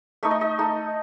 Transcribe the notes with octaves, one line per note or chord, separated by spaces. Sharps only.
A3 D#4 E5
D#5
D#5
A3 D#4